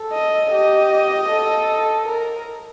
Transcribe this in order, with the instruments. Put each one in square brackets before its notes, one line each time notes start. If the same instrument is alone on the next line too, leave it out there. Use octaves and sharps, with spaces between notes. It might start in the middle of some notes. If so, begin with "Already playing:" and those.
Already playing: [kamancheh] A4
[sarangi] D#5
[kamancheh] G4 [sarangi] D#5
[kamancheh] A4
A#4